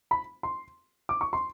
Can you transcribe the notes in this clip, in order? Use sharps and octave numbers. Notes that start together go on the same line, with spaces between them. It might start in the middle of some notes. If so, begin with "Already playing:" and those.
B5
C6
D6
C#6
C6